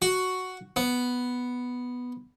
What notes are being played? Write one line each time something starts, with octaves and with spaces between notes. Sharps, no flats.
F#4
B3